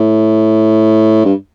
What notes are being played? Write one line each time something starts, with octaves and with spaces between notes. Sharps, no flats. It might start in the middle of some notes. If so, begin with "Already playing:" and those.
Already playing: A2
G2